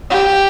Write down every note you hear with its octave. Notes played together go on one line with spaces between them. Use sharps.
G4